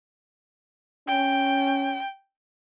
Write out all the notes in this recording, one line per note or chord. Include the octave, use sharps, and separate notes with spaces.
C#4 G5